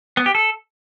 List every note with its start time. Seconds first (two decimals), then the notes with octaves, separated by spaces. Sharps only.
0.17 B3
0.26 G4
0.35 A4